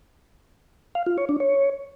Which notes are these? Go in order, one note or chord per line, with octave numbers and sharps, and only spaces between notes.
F5
F4
C#5
D4
C#5